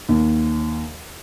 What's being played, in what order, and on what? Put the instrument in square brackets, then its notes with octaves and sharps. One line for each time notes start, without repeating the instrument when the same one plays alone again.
[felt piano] D#2